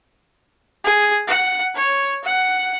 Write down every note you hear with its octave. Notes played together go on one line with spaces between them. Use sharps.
G#4
F#5
C#5
F#5